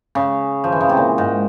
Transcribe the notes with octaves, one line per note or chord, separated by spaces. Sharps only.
C#3
F3
E3
C#3
C3
A#2
G#2